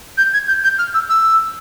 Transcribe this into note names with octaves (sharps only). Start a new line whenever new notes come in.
G6
G#6
G6
G6
F6
E6
E6